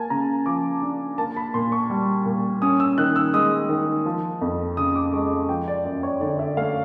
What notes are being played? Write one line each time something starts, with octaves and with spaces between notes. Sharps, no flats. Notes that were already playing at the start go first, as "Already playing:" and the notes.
Already playing: A#3 G#5 A5
C#3 A#5
F3 D6
D4
A#3 A5
B5
A#2 C6
C#6
G3
A#2
C#4 D#6
E6
D#3 F#6
E6
G#3 D#6
D#3
F3
F2
C#3 D#6
D6
G#3 C#6
F3 G5
D5
F#2 D5
C#5
D3 D5
E5
A3 F5